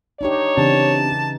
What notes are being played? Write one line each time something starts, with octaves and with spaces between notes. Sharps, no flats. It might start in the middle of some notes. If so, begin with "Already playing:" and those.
D4 D#4 G4 C#5
C#3 E3 C4 D4 G4 A5